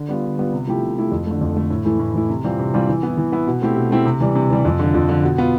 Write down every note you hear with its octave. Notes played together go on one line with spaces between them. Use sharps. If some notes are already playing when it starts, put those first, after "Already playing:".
Already playing: D3
G3 B3 F4
D3
G3 B3 F4
C3
F3 A3 E4 G4
C3
F3 A3 E4 G4
F2
D3 A3
F2
D3 A3
A2
E3 A3 E4
A2
E3 A3 E4
C3
E3 G3 C4 F4
C3
E3 G3 C4 F4
E3
B3 E4
E3
B3 E4
B2
A3 C4 E4 G4
B2
A3 C4 E4 G4
C3
E3 G3
C3
E3 G3
F2
D3 F3
F2
D3 F3
B2
B3 F4